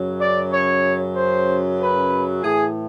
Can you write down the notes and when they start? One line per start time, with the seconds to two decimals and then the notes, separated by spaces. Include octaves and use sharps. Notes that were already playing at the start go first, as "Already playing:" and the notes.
Already playing: F#2 C#3 F#3
0.19 D5
0.51 C#5
1.14 C5
1.78 B4
2.42 A2 E3 G#4